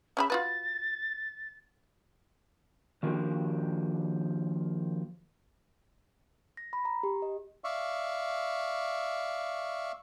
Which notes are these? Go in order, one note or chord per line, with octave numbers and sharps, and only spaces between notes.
C#4 G#4 E5 B5
F4 F#4 B4 A6
D#3 F3 A#3 D4 F#4 G4
A#6
B5
A#5
G4
D#5
D5 E5 F5 C#6